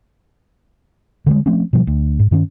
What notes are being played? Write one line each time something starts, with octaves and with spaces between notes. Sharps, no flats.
D3 F3 G3 G#3
F3 A3 C4 C#4
B2 F3 G3
D2
G#2
G2 D#3 C4 C#4